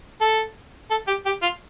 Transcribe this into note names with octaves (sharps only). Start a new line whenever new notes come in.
A4
A4
G4
G4
F4